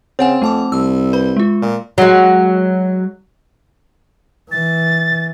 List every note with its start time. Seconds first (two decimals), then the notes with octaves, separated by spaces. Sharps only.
0.19 C#3 C4 C#5 F#5 G#5
0.42 F2 A3 A5 D6
0.72 C2 E6
1.13 B4 B5
1.37 G#3 F4
1.62 A#2
1.98 F#3 G#3
4.52 E3 A6